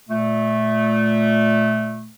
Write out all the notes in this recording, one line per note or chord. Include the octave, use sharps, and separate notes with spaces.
A#2 A3